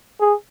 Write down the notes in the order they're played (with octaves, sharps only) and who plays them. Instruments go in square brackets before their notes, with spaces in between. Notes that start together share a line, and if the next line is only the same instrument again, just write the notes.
[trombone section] G#4